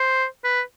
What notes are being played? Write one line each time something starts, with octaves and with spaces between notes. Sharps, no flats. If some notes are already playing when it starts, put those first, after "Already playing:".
Already playing: C5
B4